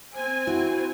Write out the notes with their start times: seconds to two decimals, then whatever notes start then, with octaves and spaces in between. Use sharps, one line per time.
0.15 C4 C5 G#5
0.47 E4 F#4